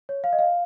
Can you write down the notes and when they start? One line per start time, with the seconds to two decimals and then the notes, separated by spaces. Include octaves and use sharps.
0.09 C#5
0.24 F5
0.33 D#5
0.39 F5